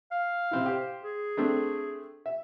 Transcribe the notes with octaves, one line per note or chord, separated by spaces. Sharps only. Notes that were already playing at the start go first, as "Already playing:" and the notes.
F5
C3 C4 E4
G4 C5
G#4
A3 C4 D4
E5